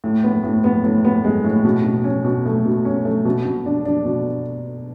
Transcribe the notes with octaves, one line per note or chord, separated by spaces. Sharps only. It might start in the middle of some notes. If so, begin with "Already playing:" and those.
A2
B3
A2
B3
A2
B3
G#3
A2
B2
B2
C#4
B2
A3
B2
C#4
A3
B2
B2
D4
D4
B2